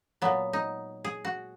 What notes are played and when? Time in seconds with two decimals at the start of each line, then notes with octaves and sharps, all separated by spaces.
0.22 A#2 F#3 B3
0.53 D#4
1.04 G#4
1.25 F#4